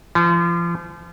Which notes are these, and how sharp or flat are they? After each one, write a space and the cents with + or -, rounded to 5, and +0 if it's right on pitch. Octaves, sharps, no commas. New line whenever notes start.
F3 -35